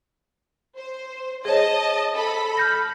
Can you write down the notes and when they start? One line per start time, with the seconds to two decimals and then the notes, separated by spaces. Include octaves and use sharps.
0.78 C5
1.45 G#4 C5 C#5 D#5 A5
2.15 A4 B5
2.57 F6 G6 A#6